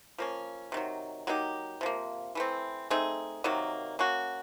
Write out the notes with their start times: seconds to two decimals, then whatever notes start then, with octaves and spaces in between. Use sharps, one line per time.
0.18 F3 A#3 C#4
0.72 C3 D#3 F#3
1.27 F#3 A#3 D#4 G4
1.81 C3 F3 A#3
2.35 E3 A3 C4
2.90 A3 C4 D#4 G#4
3.44 C3 D#3 F#3 A#3
3.99 A#3 C#4 F#4